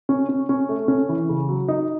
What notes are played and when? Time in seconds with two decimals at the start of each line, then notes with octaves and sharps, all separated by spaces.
0.09 C#4
0.29 C#4
0.49 C#4
0.69 A3
0.88 C#4
1.09 E3
1.29 C#3
1.49 F#3
1.68 D#4